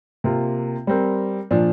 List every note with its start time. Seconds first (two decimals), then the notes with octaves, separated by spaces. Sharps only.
0.24 C3 A#3 F4
0.87 G3 C4 A#4
1.51 A#2 F3 D4